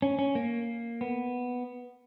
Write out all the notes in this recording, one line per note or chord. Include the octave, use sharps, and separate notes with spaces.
C#4
C#4
A#3
B3